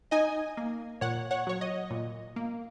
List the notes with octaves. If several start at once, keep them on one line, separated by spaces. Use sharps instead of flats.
D#4 D#5 G#5
A#3
A#2 C#5 F#5
C#5 F#5
F#3 C#5
D#5
A#2
A#3